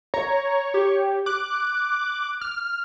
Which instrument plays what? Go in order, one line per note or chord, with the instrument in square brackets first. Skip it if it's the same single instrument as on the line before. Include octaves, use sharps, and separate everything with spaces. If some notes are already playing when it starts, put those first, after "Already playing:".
[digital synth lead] C#5 [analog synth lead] A#5
[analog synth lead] G4
[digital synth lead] D6 [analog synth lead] F#6
[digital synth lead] F6